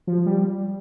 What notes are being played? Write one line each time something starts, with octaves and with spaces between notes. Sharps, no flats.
F3
G3